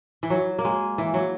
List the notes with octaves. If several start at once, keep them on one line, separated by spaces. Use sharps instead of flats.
E3
F#3
A#3
G#3
E3
F#3